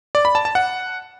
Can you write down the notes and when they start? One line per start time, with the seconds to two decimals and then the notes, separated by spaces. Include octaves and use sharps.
0.15 D5
0.25 B5
0.35 A5
0.45 A5
0.55 F#5